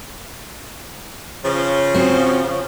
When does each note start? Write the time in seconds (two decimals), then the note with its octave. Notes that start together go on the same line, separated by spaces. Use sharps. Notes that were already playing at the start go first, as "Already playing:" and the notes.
1.44 C#3 F3
1.94 C4 F#4